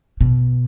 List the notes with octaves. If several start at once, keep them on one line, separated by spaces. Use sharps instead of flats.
B2